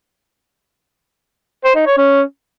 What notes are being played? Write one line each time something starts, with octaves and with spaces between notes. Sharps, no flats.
C5
D#4
C#5
C#4